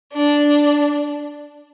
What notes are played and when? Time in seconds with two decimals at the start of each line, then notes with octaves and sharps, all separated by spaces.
0.13 D4